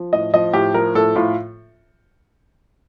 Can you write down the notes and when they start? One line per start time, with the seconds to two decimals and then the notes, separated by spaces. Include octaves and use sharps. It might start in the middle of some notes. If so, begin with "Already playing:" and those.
Already playing: F3
0.13 A2 D#5
0.34 F3 D#5
0.54 A2 G4
0.74 F3 A#4
0.95 A2 A4
1.16 A2 F4